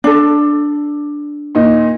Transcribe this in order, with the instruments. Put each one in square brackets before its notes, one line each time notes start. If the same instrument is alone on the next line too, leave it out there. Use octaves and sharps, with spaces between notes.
[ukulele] D4 A4
[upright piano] A#2 D#4